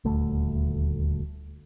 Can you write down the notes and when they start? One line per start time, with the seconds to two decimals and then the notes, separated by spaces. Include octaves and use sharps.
0.05 D#1 D2 A3